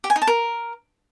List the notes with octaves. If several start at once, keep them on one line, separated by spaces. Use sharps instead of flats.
G4
G#5
D#4
A5
A#4